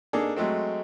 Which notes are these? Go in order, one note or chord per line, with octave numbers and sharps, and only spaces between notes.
A#3 D4 D#4 G#4 A4
F#3 G#3 A3 C4